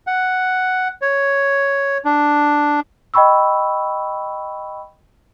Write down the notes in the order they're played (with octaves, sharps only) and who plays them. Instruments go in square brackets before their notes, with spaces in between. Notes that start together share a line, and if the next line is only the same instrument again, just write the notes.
[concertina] F#5
C#5
D4
[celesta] D#5 G5 B5 C#6 E6